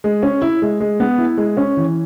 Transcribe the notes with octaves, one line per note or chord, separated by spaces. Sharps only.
G#3
C#4
E4
G#3
G#3
B3
E4
G#3
C#4
E3